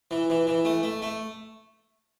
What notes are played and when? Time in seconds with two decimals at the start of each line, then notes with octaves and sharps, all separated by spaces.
0.11 E3
0.30 E3
0.47 E3
0.65 A3
0.83 A3
1.02 A3